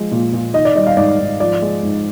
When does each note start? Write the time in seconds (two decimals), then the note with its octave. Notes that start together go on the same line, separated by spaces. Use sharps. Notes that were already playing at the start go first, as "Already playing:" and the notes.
Already playing: F3 G#3
0.12 A#2
0.33 A#2
0.54 D#3 D#5
0.65 D5
0.76 G3 D#5
0.87 F5
0.97 G#2 D5
1.19 G#2
1.40 F3 D5
1.62 G#3
1.83 G#2